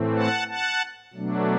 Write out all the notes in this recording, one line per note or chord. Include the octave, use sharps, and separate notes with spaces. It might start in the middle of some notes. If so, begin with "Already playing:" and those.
Already playing: A2 E3 A3 C4
F#5 A5
F#5 A5
B2 F#3 A3 D4